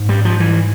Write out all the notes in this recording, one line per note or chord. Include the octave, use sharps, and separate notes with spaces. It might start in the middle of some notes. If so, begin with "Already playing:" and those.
Already playing: G#2
G3
F3
E3